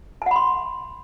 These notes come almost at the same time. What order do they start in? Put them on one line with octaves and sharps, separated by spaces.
A5 F#5 B5 C6